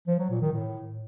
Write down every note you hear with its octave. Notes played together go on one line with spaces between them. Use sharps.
F3
F#3
A#2
D#3
A2